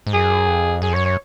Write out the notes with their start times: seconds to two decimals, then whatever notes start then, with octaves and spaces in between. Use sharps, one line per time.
0.07 G#2
0.13 F#2 G#4
0.48 F2
0.82 F#2 G#4
0.89 F2
0.93 F#2 C#5
1.05 C#5